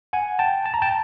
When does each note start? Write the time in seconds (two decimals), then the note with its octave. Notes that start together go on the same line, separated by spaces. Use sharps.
0.13 F#5 G#5
0.39 G5 A5
0.66 A5
0.74 A#5
0.82 G5 A5